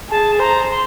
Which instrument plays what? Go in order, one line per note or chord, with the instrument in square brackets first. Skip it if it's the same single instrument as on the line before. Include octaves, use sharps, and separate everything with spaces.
[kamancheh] G#4 [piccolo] A5
[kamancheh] C5 [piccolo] A#5
[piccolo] C6